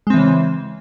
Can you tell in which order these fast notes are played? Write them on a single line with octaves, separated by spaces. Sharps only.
G#3 C4 E3 C#3